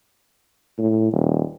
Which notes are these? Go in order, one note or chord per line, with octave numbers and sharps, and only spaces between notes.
A2
D#1